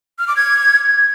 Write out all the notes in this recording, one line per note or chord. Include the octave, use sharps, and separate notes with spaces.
F6
D6
G#6